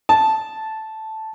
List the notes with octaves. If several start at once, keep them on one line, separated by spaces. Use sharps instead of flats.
A5